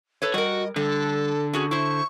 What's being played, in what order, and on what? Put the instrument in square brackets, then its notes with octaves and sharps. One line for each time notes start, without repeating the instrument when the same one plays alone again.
[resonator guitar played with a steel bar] A4 B4 C#5
[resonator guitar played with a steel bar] G3 A#4 [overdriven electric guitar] F#4 [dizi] D#5
[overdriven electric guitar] D3 [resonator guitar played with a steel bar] G3 [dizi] A4
[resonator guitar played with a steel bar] C#4 F#4 G#4
[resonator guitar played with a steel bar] E4 C5 [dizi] C#6